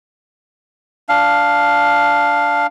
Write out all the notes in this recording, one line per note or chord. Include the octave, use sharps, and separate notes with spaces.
D4 F5